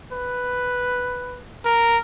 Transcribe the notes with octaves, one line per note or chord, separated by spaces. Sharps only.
B4
A#4